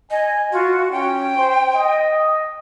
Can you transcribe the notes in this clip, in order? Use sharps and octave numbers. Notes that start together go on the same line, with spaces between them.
D#5 G#5
F4 F#4
C#4 G5
C5
D#5